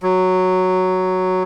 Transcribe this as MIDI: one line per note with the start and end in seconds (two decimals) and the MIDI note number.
0.03 1.43 54